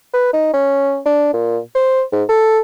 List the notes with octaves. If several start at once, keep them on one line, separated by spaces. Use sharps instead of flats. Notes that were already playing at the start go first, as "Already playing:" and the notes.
B4
D#4
C#4
D4
A#2
C5
G#2
A4